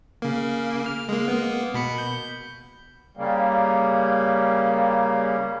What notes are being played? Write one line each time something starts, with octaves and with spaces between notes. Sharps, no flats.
C#3 A#3
F6
G#3 A#3
A#3 B3
B2 B5 C#7
G6
C#3 G3 A#3